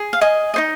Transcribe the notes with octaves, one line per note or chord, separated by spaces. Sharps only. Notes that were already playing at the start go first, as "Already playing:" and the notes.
Already playing: G#4
F5
D#5 G#5
D#4 C5 D#5